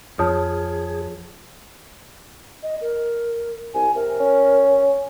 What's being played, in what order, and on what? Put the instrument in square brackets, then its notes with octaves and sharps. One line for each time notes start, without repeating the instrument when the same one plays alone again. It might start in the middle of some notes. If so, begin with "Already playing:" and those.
[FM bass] F2 [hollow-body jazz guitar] F3 [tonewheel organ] G#4 [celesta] C#5 A5
[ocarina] D#5
A#4
[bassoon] C2 [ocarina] G#5
[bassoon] C3 [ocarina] A#4
[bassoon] C#4